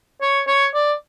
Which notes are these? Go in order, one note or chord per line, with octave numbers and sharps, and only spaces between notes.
C#5
C#5
D5